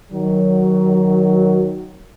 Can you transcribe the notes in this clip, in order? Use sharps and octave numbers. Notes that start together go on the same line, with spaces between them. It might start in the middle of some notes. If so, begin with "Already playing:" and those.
D#3 F#3